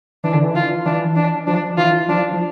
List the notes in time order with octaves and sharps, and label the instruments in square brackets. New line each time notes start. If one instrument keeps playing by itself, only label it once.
[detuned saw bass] E3 [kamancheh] D4
[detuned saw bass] D3
E3
[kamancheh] F4
[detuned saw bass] E3 [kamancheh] D4
[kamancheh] D4
[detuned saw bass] F3 [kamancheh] D4
[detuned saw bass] E3 [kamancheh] F4
[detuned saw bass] F3 [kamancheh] D4
[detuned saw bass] F3